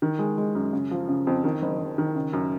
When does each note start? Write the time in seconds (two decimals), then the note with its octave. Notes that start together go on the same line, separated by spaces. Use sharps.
0.02 D#3
0.19 G#3
0.38 G#3
0.55 F#2
0.73 C#3
0.91 F3
1.09 C#3
1.27 F2
1.44 D#3
1.62 F#1
1.79 F#1
1.98 D#3
2.15 C#3
2.33 F#2